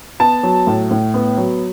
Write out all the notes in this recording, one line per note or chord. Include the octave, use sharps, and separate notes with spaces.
B3 A5
F#3
A2
A2
B3
F#3